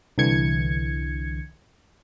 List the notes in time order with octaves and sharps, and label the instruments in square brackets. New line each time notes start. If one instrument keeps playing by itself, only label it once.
[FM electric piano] C2 D3 E3 G#6 C#7